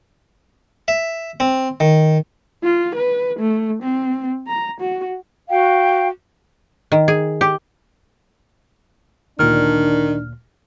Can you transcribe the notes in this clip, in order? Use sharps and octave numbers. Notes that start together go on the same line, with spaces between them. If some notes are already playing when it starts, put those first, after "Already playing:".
E5
C4
D#3
F4
B4
A3
C4
A#5
F#4
F#4 F5 G5
D#3
G#4
G4
D2 A#2 D#3 D4 F6